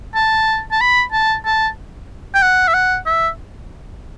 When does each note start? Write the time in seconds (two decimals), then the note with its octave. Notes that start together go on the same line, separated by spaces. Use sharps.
0.15 A5
0.71 A5
0.81 B5
1.13 A5
1.45 A5
2.35 G5
2.42 F#5
2.68 E5
2.74 F#5
3.06 E5